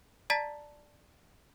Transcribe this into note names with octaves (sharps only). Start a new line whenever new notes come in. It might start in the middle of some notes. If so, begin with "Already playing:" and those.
D5 A5 A#5 A6 B6